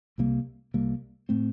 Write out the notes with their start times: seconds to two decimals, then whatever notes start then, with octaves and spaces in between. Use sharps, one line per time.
0.18 C2 C3 G3 A#3
0.74 C2 C3 G3 A#3
1.29 A2 A3 C4